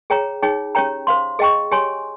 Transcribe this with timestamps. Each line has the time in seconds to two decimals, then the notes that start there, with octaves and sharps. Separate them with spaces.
0.10 G#4 C#5 G5 A#5
0.43 D#4 G#4 C#5 G5
0.75 C#4 G4 C#5 G5 A#5
1.07 C5 F5 C6
1.39 G#4 D#5 G5 C#6
1.72 G4 C#5 G#5 C6